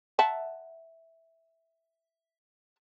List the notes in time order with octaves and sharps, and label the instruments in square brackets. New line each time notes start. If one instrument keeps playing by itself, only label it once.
[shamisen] E5 F#5 A5